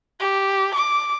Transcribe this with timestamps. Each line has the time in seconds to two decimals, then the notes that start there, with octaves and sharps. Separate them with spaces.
0.20 G4
0.74 D6